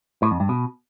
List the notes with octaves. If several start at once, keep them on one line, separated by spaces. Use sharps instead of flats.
A2
F2
G2
B2